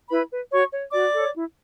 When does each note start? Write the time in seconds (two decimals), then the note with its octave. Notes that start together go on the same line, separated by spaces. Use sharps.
0.10 E4 B4 B5
0.31 B4
0.51 F#4 C#5 C#6
0.72 C#5
0.92 F#4 D5 D6
1.14 A4 C#5
1.34 E4